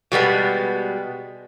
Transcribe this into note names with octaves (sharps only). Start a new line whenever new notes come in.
B2 G3 G#3 B3